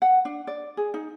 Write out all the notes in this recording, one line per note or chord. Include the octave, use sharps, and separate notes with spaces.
F#5
D4
D5
G#4
D#4